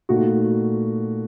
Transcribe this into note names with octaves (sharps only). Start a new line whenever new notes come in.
A#2 A3 D#4 F#4